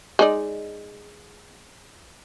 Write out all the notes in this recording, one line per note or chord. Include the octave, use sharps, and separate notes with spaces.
G#3 D#4 D5